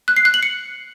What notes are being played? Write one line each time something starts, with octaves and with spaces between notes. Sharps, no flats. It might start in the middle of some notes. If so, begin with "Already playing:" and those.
F#6
C7
F#6
F#7
C#7